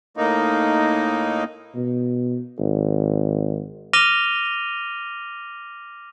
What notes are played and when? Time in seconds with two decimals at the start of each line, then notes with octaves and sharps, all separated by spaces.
0.17 A2 A#3 D#4
1.76 B2
2.58 G#1
3.93 D6 F6 A#6 D#7 F7 G7